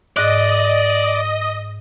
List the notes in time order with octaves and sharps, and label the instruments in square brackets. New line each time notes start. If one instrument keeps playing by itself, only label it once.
[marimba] G#2 F#6 [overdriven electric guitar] D5 [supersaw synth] D#5